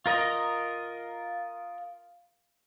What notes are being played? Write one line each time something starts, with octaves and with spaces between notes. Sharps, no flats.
F4 A#4 D#5 A#5